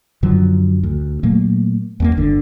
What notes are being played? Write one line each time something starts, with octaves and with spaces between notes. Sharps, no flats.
F#2 D3 F3 F#3
D2
A#2 F#3 A3 A#3
E2 A3 A#3
G1 D3